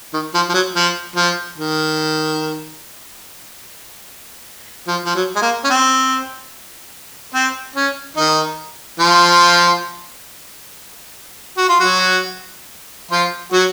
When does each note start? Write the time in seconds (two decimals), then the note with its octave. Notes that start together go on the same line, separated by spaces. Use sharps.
0.13 D#3
0.34 F3
0.49 F3
0.54 F#3
0.75 F3
1.16 F3
1.58 D#3
4.87 F3
5.05 F3
5.15 F#3
5.35 G#3
5.42 A#3
5.64 C#4
5.70 C4
7.34 C4
7.76 C#4
8.16 D#3 D#4
8.99 F3 F4
11.58 F#4
11.69 F4
11.80 F#3 F#4
13.11 F3 F4
13.52 F#3 F#4